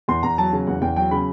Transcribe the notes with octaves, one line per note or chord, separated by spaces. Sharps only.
E2 C6
E2 A#5
F#3 A5
C#3
E2 F#5
E2 G5
F#3 G5
C#3 B5